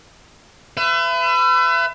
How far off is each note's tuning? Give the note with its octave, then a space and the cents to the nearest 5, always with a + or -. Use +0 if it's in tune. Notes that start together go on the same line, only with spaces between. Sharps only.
B4 +30 E5 +35